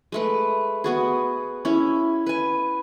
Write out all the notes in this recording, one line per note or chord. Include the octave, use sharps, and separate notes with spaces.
G#3 A3 B4
B3 F#4 G#4
C#4 E4
B4 G#5